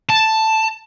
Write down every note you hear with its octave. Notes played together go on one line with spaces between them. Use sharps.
A5